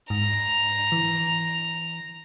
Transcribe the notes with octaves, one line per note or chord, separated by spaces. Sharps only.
G#2 A#5
E3